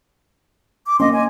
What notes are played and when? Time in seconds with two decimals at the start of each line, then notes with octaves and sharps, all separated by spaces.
0.86 D6
1.00 A#3 C#4 D#5 C6 D6
1.13 G#5